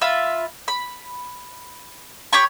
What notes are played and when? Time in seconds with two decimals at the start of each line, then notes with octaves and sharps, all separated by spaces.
0.01 F4 E5 B5
0.68 B5
2.33 G4 C#5 B5 C#6